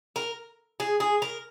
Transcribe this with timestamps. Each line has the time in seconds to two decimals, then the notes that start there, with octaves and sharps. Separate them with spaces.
0.16 A#4
0.80 G#4
1.00 G#4
1.22 A#4